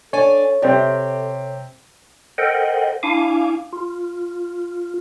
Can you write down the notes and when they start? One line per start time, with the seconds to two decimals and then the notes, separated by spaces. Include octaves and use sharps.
0.13 D4 A4 C#5 D5 G#5
0.62 C3 C4 G4 D5
2.38 A4 A#4 C5 D#5 F#5 G5
3.03 D4 E4 F5 G#5 D6
3.73 F4